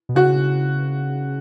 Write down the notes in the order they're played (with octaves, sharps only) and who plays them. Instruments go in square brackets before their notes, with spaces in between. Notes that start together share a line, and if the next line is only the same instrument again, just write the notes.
[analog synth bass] B2
[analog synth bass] C#3 [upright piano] F#4